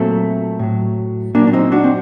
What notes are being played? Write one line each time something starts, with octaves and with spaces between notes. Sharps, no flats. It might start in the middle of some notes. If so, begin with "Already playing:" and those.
Already playing: A#2 F#3 A3 C4
A2 F#3
A#2 F#3 A#3 D4
D4
C4 D#4
D4 F#4
C4